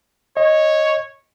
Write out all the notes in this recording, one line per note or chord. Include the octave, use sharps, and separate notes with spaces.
C#5 D#5